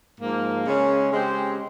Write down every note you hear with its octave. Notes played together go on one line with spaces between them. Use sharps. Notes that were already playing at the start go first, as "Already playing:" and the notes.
G#2 F3 A#3
C#3 G#3 C#4
C#3 G#3 C4 G4 C5